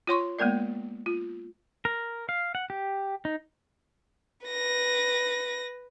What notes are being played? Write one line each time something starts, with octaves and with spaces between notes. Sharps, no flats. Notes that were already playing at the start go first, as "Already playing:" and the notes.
F4 C#5 C6 C#6
G#3 A#3 B3 A#4 D5
F4
A#4
F5
F#5
G4
D#4
B4 A#6